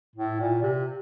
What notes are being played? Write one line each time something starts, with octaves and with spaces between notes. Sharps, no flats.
A2
A#2
C3